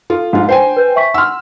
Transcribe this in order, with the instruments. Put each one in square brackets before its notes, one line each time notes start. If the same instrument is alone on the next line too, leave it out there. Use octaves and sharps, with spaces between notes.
[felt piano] F4 [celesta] A4
[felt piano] G#2 F4 [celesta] D4
[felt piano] C5 G5 G#5
[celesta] B4 G6
E5 C#6 B6
[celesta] F#5 C6 [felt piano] E6 F6